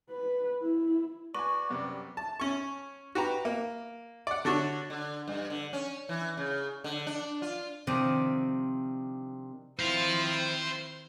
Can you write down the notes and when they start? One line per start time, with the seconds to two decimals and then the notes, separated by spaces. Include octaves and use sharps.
0.10 B4
0.62 E4
1.35 F#4 B4 D5 G#5 C#6
1.70 F#2 C3 G3 B3
2.17 A5
2.40 C#4 C#6
3.15 F#4 G4 B4 A#5
3.45 A#3
4.27 D5 F#5
4.45 D3 D4 F#4 C#5
4.90 D3
5.28 G2
5.50 D3
5.73 C#4
6.09 E3
6.37 C#3
6.84 D3
7.07 D4
7.42 F4
7.87 C3 D#3 F3 C4 D4
9.79 D#3 C4 E4 C5 F5